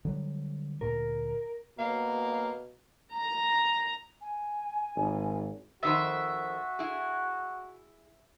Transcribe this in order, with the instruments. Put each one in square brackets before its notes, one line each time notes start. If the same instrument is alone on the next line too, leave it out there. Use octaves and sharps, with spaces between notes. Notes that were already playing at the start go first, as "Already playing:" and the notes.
[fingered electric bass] D3 F#3 G3
[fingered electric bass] D2 A#2 [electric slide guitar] A#4
[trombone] B2 [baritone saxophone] A#3 [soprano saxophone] F5
[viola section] A#5
[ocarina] G#5
[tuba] G#1
[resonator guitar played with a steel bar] F2 D#3 C5 [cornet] F#4 [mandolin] E5
[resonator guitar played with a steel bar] E4 G#4